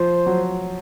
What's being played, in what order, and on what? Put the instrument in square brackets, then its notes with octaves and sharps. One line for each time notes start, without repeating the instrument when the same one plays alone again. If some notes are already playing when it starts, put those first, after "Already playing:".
Already playing: [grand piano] F3 [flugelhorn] C5
[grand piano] F#3